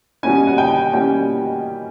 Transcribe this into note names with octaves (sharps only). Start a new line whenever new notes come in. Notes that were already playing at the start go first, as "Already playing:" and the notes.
B2 G3 A#3 C#4 G#5
F#5
G5
B2 G3 A#3 C#4 G5